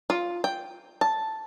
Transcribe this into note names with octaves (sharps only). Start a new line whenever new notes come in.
F4
G5
A5